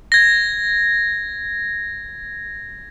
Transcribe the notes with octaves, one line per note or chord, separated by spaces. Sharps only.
G#6 A#6